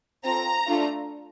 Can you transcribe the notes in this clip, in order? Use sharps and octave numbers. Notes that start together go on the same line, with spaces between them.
C4 F4 A4 A#5
A3 D4 F4 A4